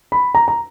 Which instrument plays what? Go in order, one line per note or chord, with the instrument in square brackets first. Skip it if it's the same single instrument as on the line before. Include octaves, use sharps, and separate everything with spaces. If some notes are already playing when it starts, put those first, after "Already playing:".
[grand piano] B5
A#5
A#5